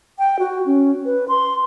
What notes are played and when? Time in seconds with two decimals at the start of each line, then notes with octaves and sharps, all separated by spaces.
0.19 G5
0.39 F#4
0.66 C#4
1.06 B4
1.28 C6